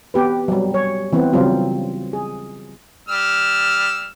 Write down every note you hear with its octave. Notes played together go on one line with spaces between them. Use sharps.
B3 G4 B4
F#3 G3
C#5
E3 B3 C4
C#3 F#3 G3 C4 F4
G#4
G3 E6 F6